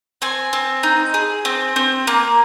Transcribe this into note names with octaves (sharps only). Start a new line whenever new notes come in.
C4 G#5
C4
D#4
G#4
C4
C4
A#3